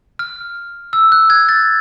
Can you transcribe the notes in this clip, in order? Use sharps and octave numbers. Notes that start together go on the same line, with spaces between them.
F6
E6
F#6
G#6
A6